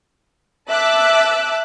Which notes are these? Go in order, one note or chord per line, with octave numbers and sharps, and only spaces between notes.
E5 A5 D6 E6 F#6